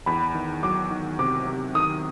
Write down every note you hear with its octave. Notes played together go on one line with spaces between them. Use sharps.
E2 B5
D#3
F#3 D6
D#3
C3 D6
C3
D#3 D#6